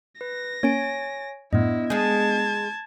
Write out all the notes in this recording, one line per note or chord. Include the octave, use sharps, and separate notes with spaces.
B4 A#6
A#3 C#4 C#5 G#5 D7
F#2 A2 B3 D4 E4 D#5
G#3 G#4 A5 G6 G#6